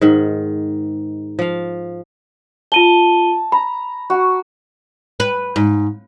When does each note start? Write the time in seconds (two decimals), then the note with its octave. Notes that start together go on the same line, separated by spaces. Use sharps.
0.01 G#2 D#3
1.39 F3 F5
2.72 F4 A5 D#7 G7
3.52 A#5 B5
4.10 F#4
5.20 B4
5.56 G#2